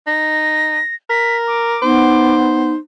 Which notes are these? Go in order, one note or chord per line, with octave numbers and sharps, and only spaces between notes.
D#4 A#6
A#4 B6
D6
B3 D#4 C5